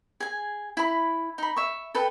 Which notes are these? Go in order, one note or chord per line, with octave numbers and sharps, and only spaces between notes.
G#4 G#5
E4 B5
D#4 B5
E5 C#6
A4 B4 G5